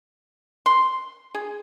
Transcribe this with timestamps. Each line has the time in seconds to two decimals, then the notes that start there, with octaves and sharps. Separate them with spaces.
0.66 C6
1.34 G#4